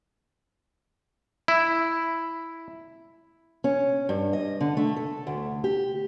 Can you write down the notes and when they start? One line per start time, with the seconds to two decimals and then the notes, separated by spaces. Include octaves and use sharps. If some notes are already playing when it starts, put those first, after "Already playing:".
1.48 E4
3.64 C#4
4.09 G2
4.33 D#5
4.60 D3
4.77 A3
4.97 A4
5.27 D2
5.64 G4